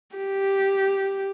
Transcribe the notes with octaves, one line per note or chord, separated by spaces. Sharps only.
G4